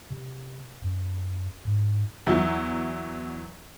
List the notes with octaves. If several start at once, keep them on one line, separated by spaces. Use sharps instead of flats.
C3
F#2
G#2
E2 E3 F#3 E4